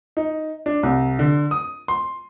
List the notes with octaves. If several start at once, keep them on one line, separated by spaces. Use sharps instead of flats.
D#4
D4
C2
D3
D#6
C6